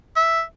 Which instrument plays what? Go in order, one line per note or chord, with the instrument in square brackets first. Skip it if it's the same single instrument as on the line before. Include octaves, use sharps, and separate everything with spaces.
[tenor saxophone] E5